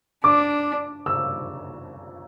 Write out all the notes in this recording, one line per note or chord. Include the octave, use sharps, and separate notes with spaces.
D4 D6
E6